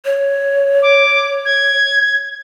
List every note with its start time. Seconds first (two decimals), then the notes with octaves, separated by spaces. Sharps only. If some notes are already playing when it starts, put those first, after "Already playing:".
0.05 C#5
0.82 D6
1.45 G#6